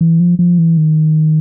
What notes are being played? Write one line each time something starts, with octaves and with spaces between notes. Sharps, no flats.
E3
F3
F3
E3
D#3